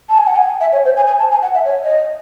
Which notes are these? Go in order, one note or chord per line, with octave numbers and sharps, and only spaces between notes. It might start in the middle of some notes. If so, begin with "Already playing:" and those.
A5
G#5
F#5
G#5
E5
C#5
C5
G#5
G#5
A5
G#5
F#5
E5
C#5
D#5